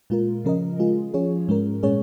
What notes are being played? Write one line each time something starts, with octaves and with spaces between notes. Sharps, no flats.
A#2 G#3 F4 A#4
C#3 F3 C#4 A#4 D#5
G#3 F4 G#4
F3 C#4 F4 G#4 C#5
G#2 G#3 C#4 A#4
A#2 G#3 C#4 G#4 C#5